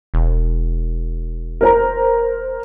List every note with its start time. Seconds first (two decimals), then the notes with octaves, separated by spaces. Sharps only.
0.14 E1
1.61 A#4 C5 A#5